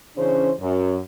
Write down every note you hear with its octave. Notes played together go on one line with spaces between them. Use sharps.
C#3 E3 C#4 D4 C5
F#2